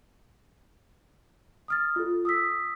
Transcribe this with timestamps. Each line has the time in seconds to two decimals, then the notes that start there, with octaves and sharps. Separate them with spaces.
1.68 D#6 F6 A6
1.96 F4 A4
2.25 D#6 E6 B6